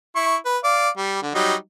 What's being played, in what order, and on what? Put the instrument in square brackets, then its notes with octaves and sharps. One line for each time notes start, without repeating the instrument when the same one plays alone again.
[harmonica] E4 C#6
B4
D5 F5
G3
D3
F#3 G3 D#4